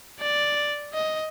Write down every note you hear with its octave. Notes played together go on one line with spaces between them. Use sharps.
D5
D#5